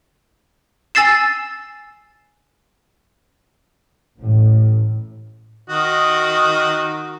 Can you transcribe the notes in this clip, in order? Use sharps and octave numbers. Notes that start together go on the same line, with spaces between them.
G#5 E6 A6 C7 E7
A1 A2
D#3 F#4 D#5